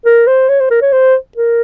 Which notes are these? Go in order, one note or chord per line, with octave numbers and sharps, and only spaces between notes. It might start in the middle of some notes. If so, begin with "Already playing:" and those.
A#4
C5
C#5
C5
A#4
C#5
C5
A#4